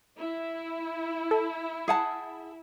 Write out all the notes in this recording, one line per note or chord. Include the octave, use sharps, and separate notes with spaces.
E4
A4
G#4 F#5 A5